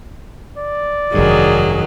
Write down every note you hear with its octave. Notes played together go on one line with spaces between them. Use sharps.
D5
F1 G2 D#3 F#3 G#4